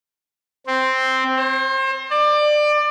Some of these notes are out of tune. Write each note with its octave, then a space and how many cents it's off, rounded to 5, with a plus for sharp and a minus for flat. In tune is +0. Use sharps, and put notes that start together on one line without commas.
C4 +0
C5 +35
D5 +25